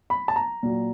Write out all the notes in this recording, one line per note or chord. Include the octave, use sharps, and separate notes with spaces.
B5
A5
A#5
A#2 F#3